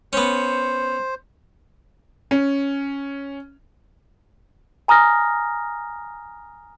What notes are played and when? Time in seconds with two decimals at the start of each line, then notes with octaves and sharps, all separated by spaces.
0.13 B3 C#4 C5
2.31 C#4
4.88 G#5 A#5 D#6 F6 A#6